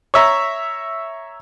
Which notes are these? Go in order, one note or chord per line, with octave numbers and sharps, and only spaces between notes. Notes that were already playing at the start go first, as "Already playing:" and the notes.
C#5 E5 A#5